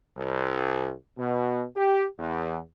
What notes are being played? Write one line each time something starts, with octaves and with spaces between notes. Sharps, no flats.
C2
B2
G4
E2